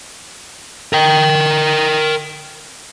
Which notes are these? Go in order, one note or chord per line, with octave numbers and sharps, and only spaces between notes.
A#4 G5